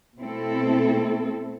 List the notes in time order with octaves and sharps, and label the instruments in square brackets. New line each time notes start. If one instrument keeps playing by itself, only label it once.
[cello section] B2 A3 C4 E4 A4